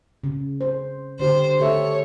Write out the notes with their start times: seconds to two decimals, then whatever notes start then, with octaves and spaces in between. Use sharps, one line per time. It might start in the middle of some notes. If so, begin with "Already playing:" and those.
0.24 C#3
0.61 C5
1.20 D3 G4 C5
1.60 G4 A4 C#5 E5